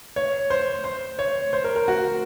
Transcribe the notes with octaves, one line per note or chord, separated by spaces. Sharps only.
C#5
C5
C5
C#5
C5
A#4
A#4
F#4